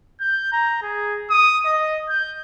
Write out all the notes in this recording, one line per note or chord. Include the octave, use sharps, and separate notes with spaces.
G6
A#5
G#4
D#6
D#5
G6